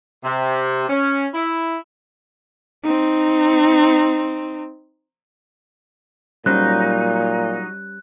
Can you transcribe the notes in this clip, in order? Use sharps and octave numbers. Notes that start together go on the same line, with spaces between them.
C3
C#4
E4
C4 D#4
A#2 F#3 G3 C#4 D#4 C5 F#6